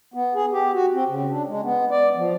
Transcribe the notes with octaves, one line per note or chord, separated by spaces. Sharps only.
B3
G#4
G4
F#4
C4
C#3
D4
G#3
B3
D5
F3